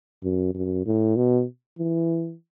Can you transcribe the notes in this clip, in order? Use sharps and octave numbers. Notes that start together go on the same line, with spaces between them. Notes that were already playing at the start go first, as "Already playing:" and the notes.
F#2
F#2
A2
B2
E3